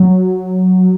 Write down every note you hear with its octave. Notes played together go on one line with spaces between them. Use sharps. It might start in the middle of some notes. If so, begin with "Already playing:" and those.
Already playing: F#3